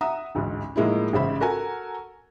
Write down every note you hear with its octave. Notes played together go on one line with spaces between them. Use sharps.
E5 F#5 A#5 D#6
A1 D2 G#2
A2 F3 G#3 A#3 D#4 E4
A1 G#2 C#3 C5 E5 B5
F#4 A4 A#4 F#5 G#5